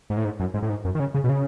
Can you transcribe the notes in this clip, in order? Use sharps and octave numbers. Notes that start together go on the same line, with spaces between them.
G#2
A2
G#2
F#2
G#2
A2
G#2
F#2
D#3
C#3
C#3
B2
C#3